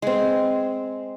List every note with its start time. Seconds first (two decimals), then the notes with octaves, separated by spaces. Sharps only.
0.02 G#3 C4